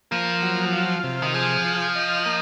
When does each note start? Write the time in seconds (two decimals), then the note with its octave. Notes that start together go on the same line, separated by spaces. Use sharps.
0.11 F3 A#3
0.42 F#3
0.73 F4
1.04 C3
1.22 D#3
1.34 F3 G#4
1.65 F4
1.95 D#5
2.26 A#3